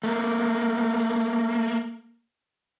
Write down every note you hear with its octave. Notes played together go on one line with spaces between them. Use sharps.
A3 A#3